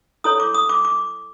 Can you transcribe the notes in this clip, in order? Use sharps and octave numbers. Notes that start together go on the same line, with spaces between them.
E4 A4 C#5 D#6
D6
D#6
D6
D6